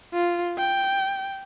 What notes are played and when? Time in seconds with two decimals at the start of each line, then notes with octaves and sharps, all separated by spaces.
0.14 F4
0.58 G5